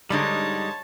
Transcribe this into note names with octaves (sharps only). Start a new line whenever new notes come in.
G#2 D3 G3 G#3 D#4 C#5 A5